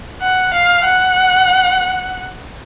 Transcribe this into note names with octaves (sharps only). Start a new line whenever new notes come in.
F#5
F5
F#5